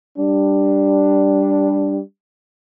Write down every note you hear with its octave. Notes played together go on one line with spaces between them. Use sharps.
G3 D4